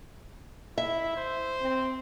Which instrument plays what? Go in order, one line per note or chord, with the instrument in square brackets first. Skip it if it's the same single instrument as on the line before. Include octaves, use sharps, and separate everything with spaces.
[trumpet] E4 [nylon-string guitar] E5
[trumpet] C5
[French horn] C4